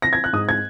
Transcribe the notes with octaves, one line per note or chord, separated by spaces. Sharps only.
A#6
G#6
F#6
G#2 D#6
G#6